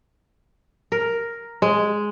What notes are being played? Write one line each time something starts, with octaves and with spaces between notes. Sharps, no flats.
A#4
G#3